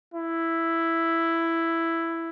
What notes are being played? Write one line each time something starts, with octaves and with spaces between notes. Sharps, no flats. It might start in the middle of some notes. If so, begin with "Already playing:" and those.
E4